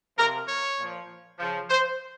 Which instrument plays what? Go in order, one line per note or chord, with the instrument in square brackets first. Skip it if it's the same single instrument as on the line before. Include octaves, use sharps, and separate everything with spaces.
[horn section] C3 F3 A#4
C#5
A#2 F3
C#3 F3
C5